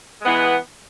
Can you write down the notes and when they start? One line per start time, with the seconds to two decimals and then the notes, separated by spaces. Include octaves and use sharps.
0.21 G#3
0.24 B3
0.27 E3